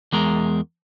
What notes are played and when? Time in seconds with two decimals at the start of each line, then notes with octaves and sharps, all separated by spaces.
0.13 E2 G#3 A#4